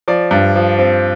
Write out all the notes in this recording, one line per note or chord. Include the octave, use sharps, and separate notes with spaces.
F3 D5
G2
F3
C4